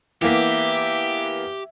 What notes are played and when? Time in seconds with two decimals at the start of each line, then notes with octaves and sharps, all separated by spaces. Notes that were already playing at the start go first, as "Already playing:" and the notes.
0.22 E3 A#3 B3 G4 E5